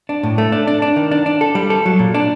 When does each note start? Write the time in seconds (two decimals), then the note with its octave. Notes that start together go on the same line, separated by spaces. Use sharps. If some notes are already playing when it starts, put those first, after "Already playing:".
0.09 D4
0.23 A2
0.38 A3
0.52 D4
0.67 D4
0.82 D4
0.96 D#3
1.11 D4
1.26 D4
1.41 A4
1.55 G3
1.70 A4
1.86 F#3
1.99 A#2
2.14 D4